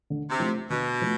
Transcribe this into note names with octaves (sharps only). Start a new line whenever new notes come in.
D3
C3
F3 A3
B2 D3
F3 A3